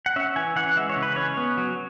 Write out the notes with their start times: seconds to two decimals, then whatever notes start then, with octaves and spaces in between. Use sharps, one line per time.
0.06 F#5
0.16 C#4 E5
0.36 E3 G#5
0.56 E3 F#5
0.77 G#3 E5
0.89 C#5
0.96 C#3
1.03 B4
1.16 C#4 C#5
1.37 B3
1.57 F#3